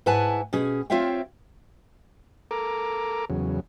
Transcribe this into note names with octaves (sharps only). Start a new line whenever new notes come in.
G#2 E4 B4 F#5 G#5 A5
B2 C#4 G#4
C4 F4 C#5 E5 F5 G5
A4 A#4 A#5 D6
E2 C#3 F#3